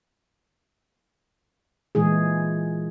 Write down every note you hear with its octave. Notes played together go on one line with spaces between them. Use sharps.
A#2 E3 G#3 G#4